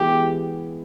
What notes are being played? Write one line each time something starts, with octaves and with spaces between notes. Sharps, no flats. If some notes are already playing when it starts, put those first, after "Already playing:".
Already playing: E3 G#3 B3 F#4 G4